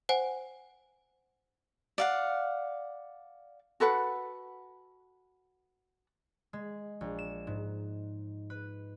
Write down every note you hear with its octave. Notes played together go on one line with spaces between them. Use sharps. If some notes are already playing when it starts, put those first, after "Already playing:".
C5 F#5 G#5
D5 F5 F#5
F#4 A4 B4 F#5
G#3
A#1
E7
G#2
B4